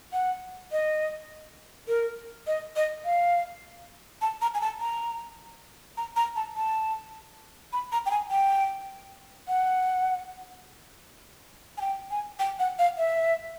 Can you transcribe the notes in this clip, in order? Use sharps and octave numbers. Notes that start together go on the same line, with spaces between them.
F#5
D#5
A#4
D#5
D#5
F5
A5
A#5
G#5
A5
A#5
A#5
A#5
A5
A5
B5
A#5
G5
G#5
G5
F#5
G#5
G5
G#5
G5
F#5
F5
E5